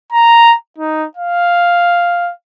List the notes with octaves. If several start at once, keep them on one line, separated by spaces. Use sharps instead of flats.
A#5
D#4
F5